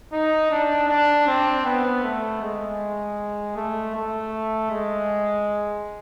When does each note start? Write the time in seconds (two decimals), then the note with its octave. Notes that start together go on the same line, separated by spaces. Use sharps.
0.13 D#4
0.51 D4
0.89 D4
1.27 C4
1.66 B3
2.04 A3
2.42 G#3
3.57 A3
3.95 A3
4.71 G#3